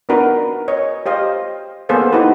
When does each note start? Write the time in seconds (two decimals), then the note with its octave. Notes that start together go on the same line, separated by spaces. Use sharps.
0.09 B3 D4 D#4 F#4 A#4 B4
0.68 C#5 D#5
1.06 G4 C5 D#5 F5
1.89 A#3 B3 G#4 A4 C5 F5
2.13 D#4 E4 F#4 G4 B4